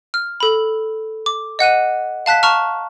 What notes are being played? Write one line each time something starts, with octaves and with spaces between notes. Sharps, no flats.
F6
A4 B5
D6
D#5 F#5 F#6 D#7
F5 A5 F#6 B6
A5 A#5 C#6 F6